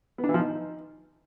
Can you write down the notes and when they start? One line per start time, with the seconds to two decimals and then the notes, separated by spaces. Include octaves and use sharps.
0.18 B3
0.24 D4
0.29 E3
0.34 F3
0.39 D#4